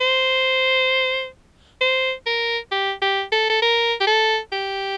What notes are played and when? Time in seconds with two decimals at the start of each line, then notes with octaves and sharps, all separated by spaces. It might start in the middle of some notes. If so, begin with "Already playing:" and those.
0.01 C5
1.81 C5
2.27 A#4
2.71 G4
3.02 G4
3.32 A4
3.50 A4
3.62 A#4
4.01 G4
4.07 A4
4.52 G4